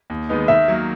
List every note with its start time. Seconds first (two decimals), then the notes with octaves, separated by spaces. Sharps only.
0.10 D#2
0.29 D#3 G#3 B3 D#4
0.48 D#3 E5
0.68 F#3 A#3